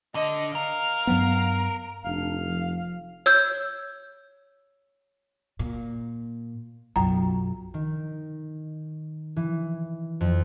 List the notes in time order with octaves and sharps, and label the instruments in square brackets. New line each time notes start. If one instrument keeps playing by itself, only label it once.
[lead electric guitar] D3 [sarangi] D#5
[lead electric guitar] A#4 [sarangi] F5
[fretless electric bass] G2 F#3 B3
[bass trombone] F1 [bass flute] D4 [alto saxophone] F5
[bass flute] F3
[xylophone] C#5 E6 G6
[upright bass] A#2
[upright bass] B1 F#3 [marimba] F#2 A#5
[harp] D#3
E3
F2